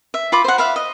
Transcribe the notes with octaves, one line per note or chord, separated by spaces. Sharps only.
E5
F4 B5 D6
C5 F#5
E5 F5 B5
D#5